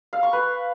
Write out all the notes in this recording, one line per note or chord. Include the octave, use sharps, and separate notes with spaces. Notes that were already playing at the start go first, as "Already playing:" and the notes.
F5
C#6
B4